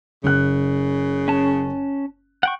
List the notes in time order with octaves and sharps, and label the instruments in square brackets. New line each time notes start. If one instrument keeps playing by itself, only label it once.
[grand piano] F#1 F#6 [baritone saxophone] C#3
[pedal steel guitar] C#4 A5
F#5 G5 C#6